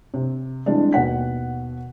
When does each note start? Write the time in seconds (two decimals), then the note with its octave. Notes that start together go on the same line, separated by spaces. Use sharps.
0.14 C3
0.66 E3 G3 G#3 C4 D4
0.93 D#2 B2 F#5 B6